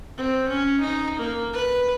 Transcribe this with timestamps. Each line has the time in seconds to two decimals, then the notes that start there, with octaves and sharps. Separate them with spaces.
0.17 C4
0.49 C#4
0.80 D#4
1.19 A#3
1.53 B4